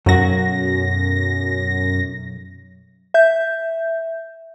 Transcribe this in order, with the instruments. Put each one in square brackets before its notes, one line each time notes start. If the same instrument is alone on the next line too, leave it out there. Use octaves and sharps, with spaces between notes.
[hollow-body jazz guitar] B1 F#3 F#4 [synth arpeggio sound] F#2 A#6
[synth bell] E5 G6